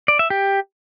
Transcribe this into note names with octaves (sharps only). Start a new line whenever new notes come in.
D5
E5
G4